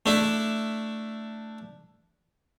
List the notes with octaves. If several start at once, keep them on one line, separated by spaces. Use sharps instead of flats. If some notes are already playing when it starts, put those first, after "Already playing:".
A3 D4 E4